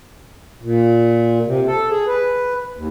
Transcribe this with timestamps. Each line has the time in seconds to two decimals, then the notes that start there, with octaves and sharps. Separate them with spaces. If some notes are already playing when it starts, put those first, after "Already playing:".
0.62 A#2
1.46 C3
1.67 A4
1.90 G#4
2.07 B4
2.76 D#2